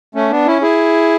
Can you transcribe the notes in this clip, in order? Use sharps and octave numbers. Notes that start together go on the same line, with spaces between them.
A3 C#4
B3 D4
C#4 E4
E4 G#4